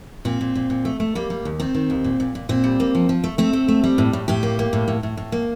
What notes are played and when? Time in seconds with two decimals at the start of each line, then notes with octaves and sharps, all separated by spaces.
0.25 A#2 C4
0.41 A#2
0.55 A#2
0.70 A#2
0.85 A3
1.00 A3
1.15 G3 A#3
1.30 G3
1.45 D#2
1.60 D#3 C4
1.75 D#3
1.90 D#2
2.04 A#2
2.20 A#2
2.35 A#2
2.49 A#2 C4
2.64 G3
2.80 A#3
2.95 F3
3.09 F3
3.24 A3
3.38 A3 C4
3.53 A3
3.68 A3
3.84 G3
3.98 A2
4.13 A2
4.28 A2 G4
4.43 A#3
4.59 A#3
4.73 A2
4.88 A2
5.03 A2
5.17 A2
5.32 A#3